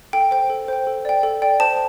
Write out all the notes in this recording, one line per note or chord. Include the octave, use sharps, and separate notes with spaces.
A4 G5
C5 G5
A4
C5 G5
A4
D5 G5
A4
D5 G5
C5 A5